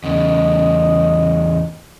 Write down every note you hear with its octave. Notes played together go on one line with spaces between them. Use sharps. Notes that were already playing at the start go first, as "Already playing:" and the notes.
E2 C#3 D#5